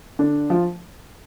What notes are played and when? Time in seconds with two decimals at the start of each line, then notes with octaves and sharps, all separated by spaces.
0.19 D3 D4
0.50 F3 F4